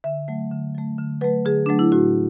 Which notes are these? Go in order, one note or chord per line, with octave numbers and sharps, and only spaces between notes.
D3 E5
F#3 A3
D3
F#3 A3
D3
F#3 A3 B4
D3 G#4
F#3 A3 D4
E4
A2 F#4